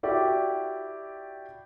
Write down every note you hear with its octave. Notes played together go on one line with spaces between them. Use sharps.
E4 F#4 G4 D5